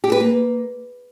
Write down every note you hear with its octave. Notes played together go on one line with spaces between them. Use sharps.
G4
B4
A#3